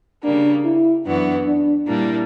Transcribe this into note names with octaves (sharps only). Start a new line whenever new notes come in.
C#3 G3 A#3 D4
E4
F#2 E3 B3 D4 F#4
D4
A#2 G3 A#3 D4 E4